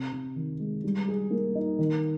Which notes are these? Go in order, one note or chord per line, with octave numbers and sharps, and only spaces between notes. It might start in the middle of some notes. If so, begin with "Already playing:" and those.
Already playing: C3
C3
D#3
G#3
G3
G#4
A#3
D#4
D#3